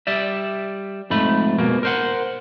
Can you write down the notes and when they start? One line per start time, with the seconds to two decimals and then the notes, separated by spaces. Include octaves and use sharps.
0.07 G3 D5 E5
1.10 F2 G#2 A3 B5
1.58 G#2 B2 A#3
1.83 A#4 C5 F#5